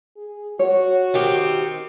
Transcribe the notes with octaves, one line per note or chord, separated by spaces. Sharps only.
G#4
F#4 C#5
D#3 C4 G4